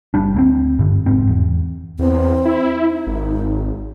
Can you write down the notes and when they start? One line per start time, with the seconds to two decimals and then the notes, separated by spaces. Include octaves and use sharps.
0.14 F#1 G3 D4
0.35 D2 A#3 C4
0.79 G2 D3
1.06 F1 G#2 C4
1.29 E2
1.99 E2 C4
2.45 E4
2.90 D#4
3.07 G#1